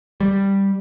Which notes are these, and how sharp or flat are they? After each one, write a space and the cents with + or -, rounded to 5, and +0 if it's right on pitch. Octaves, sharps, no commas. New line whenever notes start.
G3 +5